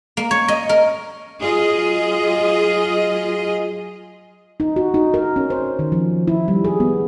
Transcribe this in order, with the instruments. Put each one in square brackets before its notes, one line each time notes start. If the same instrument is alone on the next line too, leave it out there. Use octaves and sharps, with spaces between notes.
[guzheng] A#3
C#5
D#5
A#4
[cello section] F#3 F4 G#4 D#5
[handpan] D#4
F#4
D#4
A#4
C#4
C5
D#3
F3
E4
G3
G#4
B3